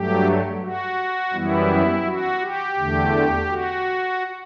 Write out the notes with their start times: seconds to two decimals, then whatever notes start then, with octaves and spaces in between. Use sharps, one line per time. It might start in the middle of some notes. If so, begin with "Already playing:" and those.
Already playing: G2 F#3 A3 G4
0.62 F#4
1.33 F#2 E3 G3 B3 E4
2.06 F#4
2.41 G4
2.77 E2 D3 A3
3.48 F#4